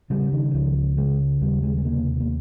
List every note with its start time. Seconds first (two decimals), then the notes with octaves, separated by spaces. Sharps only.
0.10 C#3 G3
0.32 D#3
0.54 C#2 F3
0.97 C#3 G#3
1.41 D#2 G3
1.63 G#3
1.78 G#3
1.84 C3 A#3
2.20 A#3